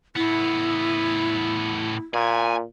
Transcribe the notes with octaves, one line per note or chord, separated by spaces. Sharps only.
A2 B3 E4
A#2 G#5